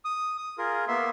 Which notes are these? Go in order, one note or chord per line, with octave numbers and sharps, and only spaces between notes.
D#6
D#6
F4 G#4 A#4
A#3 B3 E5 C6